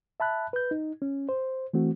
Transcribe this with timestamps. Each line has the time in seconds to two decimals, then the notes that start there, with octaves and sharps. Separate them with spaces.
0.20 E5 A5 B5 F#6
0.53 B4 G6
0.71 D#4
1.02 C#4
1.29 C5
1.74 E3 A3 C4 F#4